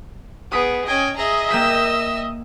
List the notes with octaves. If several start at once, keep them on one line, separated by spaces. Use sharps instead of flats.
B3 G#4 D#6 B6 D7
C#4 D#5 G5 G#5
G#4 D#5 E5 A#5
A#3 G5 E6 B6